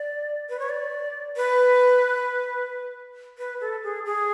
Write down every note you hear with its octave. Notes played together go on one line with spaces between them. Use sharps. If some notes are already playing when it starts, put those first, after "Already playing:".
Already playing: D5
B4
C#5
D5
B4
B4
A4
G#4
G#4